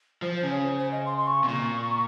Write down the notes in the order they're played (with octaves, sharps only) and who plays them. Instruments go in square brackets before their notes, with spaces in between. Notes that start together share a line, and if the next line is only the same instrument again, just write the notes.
[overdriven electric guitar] F3 [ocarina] C5
[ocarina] C5
[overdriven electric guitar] C#3
[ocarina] C#5
C5
C5
D#5
C6
C6
C#6
[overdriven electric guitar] C3
[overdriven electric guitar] A#2 [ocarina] C#6